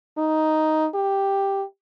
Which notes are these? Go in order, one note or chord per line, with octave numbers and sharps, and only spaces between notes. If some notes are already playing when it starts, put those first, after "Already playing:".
D#4
G4